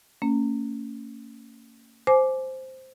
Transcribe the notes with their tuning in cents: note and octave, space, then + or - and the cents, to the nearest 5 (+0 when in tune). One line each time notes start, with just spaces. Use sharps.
A#3 -40 C#4 +10
C5 +0 G#5 +30 D6 +0